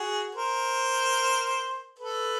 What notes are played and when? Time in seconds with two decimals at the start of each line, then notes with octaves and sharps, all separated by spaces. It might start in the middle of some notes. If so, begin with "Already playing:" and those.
Already playing: F#4 G#4
0.35 A#4 C5
1.99 A4 B4